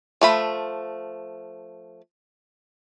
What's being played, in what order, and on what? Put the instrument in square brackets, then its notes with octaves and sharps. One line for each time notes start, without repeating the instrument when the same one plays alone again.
[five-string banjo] F3 A3 B5